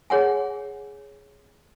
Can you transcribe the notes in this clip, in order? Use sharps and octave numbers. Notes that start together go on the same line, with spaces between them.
G#4 C#5 F#5 G#5